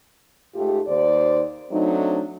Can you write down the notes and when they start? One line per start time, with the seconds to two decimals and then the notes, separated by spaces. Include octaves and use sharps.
0.55 G#2 A3 F4 G4
0.88 D#2 C5 D5
1.71 F#3 A3 C4 D4 D#4